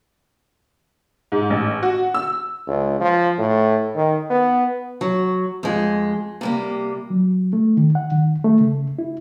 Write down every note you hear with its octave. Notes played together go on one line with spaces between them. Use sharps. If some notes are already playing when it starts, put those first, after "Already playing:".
G#2
A1
F#4
E6
C#2
F3
A2
D#3
B3
F#3
F2 G#3
C3 G3 A#3
F#3
A3
D#3
F#5
D#3
A3
C#3
E4